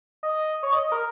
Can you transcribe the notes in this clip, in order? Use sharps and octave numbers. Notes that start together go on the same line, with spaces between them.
D#5
C#5
D#5
D#5
A#4